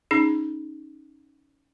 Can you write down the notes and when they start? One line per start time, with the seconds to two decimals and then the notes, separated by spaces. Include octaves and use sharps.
0.11 C#4 D#4 G#4